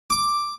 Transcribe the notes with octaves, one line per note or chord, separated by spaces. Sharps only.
D6